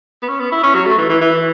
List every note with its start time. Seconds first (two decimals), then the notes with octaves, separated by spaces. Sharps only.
0.23 B3
0.28 C#4
0.40 B3
0.52 E4
0.64 C#4
0.75 F#3
0.86 A3
0.98 E3
1.10 E3
1.22 E3